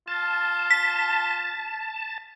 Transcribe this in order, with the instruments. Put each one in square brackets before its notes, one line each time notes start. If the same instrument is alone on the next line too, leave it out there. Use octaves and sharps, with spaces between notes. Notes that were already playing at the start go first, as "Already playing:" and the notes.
[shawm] F4 [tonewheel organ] A5
[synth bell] B6